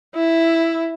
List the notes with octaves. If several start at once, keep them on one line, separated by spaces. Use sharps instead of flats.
E4